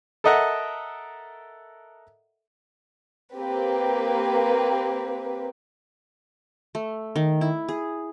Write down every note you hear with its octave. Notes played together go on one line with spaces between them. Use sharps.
A4 A#4 D#5 E5 F#5 A#5
A#3 C4 G4 B4
A3
D#3
E4
G#4